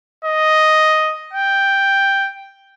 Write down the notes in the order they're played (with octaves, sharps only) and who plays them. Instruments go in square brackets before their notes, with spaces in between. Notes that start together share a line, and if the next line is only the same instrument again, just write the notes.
[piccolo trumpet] D#5
G5